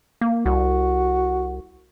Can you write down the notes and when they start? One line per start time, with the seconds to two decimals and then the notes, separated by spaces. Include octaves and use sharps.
0.21 A#3
0.46 C2 F#4